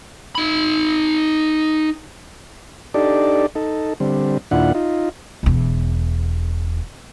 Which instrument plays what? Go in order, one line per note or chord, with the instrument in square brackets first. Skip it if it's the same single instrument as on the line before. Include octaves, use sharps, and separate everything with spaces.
[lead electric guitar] D#4 B5
[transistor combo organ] D4 D#4 G4 A4 D5
D#4 A4
D3 G3 C4
D#2 A#2 D4 E4 F4 F#5
D#4 F4
[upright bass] E1 E2